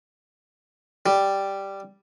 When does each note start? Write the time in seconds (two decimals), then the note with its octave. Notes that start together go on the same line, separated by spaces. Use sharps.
1.06 G3